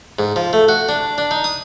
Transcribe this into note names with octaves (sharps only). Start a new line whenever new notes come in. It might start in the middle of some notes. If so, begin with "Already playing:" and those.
G#2
F3
A3
F#4
D4
D4
D#4
D#6